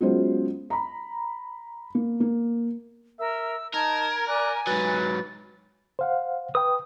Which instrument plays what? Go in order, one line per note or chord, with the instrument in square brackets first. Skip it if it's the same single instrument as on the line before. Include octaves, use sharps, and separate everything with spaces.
[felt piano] F#3 G#3 B3 C#4 F4 C5
A#5 B5
A#3
A#3
[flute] A#4 [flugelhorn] E5 [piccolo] E6
[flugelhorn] D#4 [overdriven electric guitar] A#4 [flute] A5 [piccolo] G#6
[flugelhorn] D5 [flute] G#5 [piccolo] F#6
[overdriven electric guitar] G#2 F#3 [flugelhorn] B4 [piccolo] A6
[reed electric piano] C5 F5 F#5
[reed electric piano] B4 G5 [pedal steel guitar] D#6